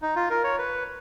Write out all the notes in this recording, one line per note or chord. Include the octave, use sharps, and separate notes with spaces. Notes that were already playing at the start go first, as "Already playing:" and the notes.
D#4
F4
A#4
C#5
B4